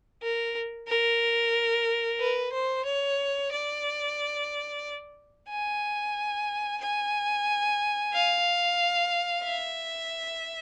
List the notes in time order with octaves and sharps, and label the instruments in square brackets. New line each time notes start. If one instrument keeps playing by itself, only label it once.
[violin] A#4
A#4
B4
C5
C#5
D5
G#5
G#5
F5
E5